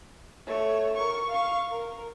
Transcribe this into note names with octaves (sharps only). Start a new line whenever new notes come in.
A3 C#5
A#4 C#6
F5 C#6
A#4